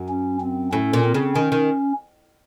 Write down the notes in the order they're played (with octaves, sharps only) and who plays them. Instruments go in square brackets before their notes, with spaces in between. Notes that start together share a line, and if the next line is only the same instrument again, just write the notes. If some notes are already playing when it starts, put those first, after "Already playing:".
Already playing: [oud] F#2
[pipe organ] C#4
C4
[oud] A2 [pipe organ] C#4
[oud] A#2
[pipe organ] C4
[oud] C#3
[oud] D#3 [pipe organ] C#4
[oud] D#3